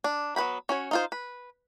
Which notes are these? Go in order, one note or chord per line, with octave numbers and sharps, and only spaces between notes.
D4
F#3 B3 B4 G5 B5
C#4 F#4 C#5
D#4 F4 C5
B4